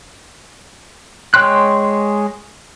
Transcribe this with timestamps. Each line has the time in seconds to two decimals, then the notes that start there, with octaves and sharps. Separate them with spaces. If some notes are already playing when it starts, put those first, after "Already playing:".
1.34 G#3 C#5 G5 C6 F#6